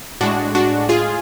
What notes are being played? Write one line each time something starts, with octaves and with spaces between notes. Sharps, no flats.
A2 G#3 D4 F#4
D4 F#4
F4 G#4